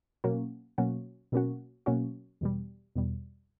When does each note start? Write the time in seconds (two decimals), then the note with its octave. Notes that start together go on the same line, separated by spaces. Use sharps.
0.24 B2 F#3 A#3 C#4 F#4
0.78 B2 F#3 A#3 C#4 F#4
1.32 B2 F#3 A#3 C#4 F#4
1.86 B2 F#3 A#3 C#4 F#4
2.41 E2 B2 G3
2.95 E2 B2 G3